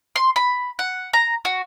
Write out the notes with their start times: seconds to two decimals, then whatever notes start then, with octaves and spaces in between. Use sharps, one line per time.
0.16 C6
0.36 B5
0.79 F#5
1.13 A#5
1.45 F#4